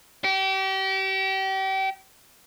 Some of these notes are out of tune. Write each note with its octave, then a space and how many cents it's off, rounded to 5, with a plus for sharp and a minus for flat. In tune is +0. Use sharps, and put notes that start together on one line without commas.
G4 -35